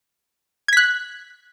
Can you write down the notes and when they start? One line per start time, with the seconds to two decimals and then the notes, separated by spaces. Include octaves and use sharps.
0.68 G#6
0.73 B6
0.77 F#6